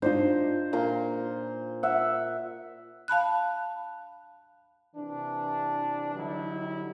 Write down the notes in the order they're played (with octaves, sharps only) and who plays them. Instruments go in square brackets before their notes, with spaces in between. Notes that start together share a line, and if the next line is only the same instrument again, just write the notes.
[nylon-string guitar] D4 D#4 F4 [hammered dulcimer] C5
[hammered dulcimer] A#2 A#5 C6
E5 F#5
[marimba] F5 A5 B5 F#6
[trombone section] C3 E3 D4
D3 F#3 G3 D#4 E4